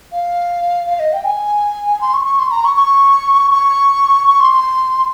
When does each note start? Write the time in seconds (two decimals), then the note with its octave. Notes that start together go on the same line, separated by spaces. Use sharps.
0.12 F5
0.87 F5
1.00 D#5
1.13 G5
1.24 G#5
2.01 C6
2.14 C#6
2.25 C#6
2.39 C6
2.51 A#5
2.64 C#6
2.76 C#6
3.52 C#6
4.27 C#6
4.40 C6
4.52 C6